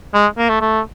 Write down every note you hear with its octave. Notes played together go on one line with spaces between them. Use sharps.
G#3
A#3
A3
A3